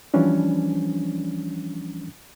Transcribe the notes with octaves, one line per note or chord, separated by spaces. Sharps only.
E3 F3 G3 C#4 D4